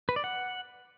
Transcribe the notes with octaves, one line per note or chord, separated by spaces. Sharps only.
B4
D5
F#5